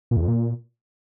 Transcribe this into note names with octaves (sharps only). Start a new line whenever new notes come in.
A#2
E2
F2
A#2